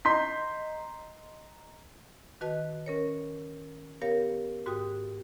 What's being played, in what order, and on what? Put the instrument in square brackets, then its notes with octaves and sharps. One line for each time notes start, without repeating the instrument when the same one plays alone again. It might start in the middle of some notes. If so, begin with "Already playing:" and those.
[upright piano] D#5 A#5 C6 G6 B6
[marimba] D#3 F#4 B4 D#5 A5 F#6
C#4 A#4 C#5
B3 G4 A#4 C#5 F5
G#2 F#4 G4 G5 D#6